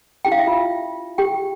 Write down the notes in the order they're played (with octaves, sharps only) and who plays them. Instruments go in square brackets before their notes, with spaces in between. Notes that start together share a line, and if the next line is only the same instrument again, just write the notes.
[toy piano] C#4 E4 G4 G5
F5
E5
F4 F5
G4 G5